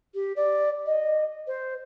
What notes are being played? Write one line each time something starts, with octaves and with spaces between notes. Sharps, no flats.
G4
D5
D#5
C5